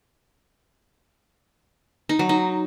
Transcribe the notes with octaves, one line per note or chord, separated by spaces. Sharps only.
D#4
F#3
D#4